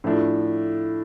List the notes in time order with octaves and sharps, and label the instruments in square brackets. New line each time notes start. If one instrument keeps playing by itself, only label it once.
[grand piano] A2 F3 A3 D4